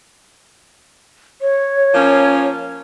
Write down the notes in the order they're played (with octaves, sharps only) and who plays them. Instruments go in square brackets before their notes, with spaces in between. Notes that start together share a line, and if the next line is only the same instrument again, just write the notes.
[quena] C#5
[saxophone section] F3 A#3 C#4